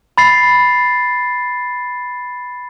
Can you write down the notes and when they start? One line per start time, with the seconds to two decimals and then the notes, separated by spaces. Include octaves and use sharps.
0.18 B5 A6 C7